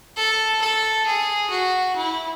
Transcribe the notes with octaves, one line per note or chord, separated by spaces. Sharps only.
A4
A4
G#4
F#4
E4